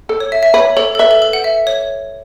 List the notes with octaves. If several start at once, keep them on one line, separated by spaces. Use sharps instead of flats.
A4
C#5
E5
E5
B4 C#5
A4 C#5
A4
B4 E5
A4
A4
F#5
E5
C#5